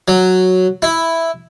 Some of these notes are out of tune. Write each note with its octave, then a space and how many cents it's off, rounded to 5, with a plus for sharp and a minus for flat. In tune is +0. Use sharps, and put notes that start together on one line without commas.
F#3 +0
E4 +0